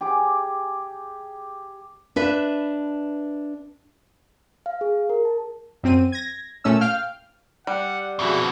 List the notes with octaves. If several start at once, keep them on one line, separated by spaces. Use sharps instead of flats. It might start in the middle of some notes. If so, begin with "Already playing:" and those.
G4 G#4 D6
D4 B4 E5
F5
G#4
A#4
A5
F#2 C4 D#7
G#6 A#6
A#2 A3 C#4 E6
F5 G5 F6
G3 F#5
F2 B2 C4 F#4 G#4 E5